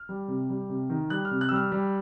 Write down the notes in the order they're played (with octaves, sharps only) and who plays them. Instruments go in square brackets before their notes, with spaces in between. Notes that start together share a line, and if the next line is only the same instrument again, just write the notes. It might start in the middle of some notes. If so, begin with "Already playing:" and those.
Already playing: [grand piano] F6
G3
C3
G3
C3
D#3
G3 F#6
F6
C3
F#6
E6
G3 F6
G3